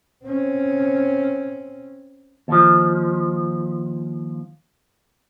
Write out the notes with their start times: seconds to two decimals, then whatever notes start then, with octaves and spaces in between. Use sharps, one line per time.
0.25 C4 C#4
2.48 D#2 F3